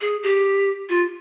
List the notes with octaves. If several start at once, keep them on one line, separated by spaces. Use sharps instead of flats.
G#4
G4
F4